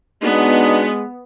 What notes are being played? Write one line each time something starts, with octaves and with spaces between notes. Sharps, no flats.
G#3 B3 D4 D#4 F#4